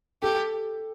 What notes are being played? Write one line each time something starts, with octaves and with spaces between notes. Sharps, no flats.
G4 A4